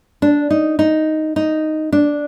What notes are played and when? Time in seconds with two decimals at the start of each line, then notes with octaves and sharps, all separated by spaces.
0.22 D4
0.50 D#4
0.79 D#4
1.36 D#4
1.92 D4